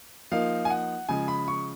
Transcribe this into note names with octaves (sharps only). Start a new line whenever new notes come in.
F3 A#3 D#4 F5
G#5
F#5
C#3 F3 G#3 G#5
B5
C#6